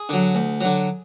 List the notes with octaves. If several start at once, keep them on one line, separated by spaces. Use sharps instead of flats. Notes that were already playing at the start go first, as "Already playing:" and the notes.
Already playing: G#4
D3 F#3
D2
D3 F#3